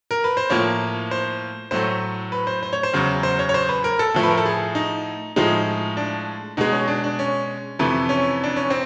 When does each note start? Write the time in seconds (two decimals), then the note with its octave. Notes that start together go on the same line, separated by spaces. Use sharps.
0.11 A#4
0.24 B4
0.37 C5
0.50 A2 F3 A#3 C#5
1.11 C5
1.71 A2 F#3 A3 C5
2.32 B4
2.47 C5
2.63 C5
2.73 C#5
2.83 C5
2.93 E2 C#3 F#3
3.23 C5
3.39 C#5
3.49 C#5
3.54 C5
3.69 B4
3.84 A#4
3.99 A4
4.14 A2 F3 A3
4.23 B4
4.30 A#4
4.37 A4
4.45 G#4
4.75 D#4
5.36 A2 F3 G#3 D#4
5.97 D4
6.57 B2 G#3 D#4
6.72 C#4
6.88 D4
7.04 D4
7.19 C#4
7.79 F2 C3 E3 A3
8.09 C#4
8.44 D4
8.56 C#4
8.70 C4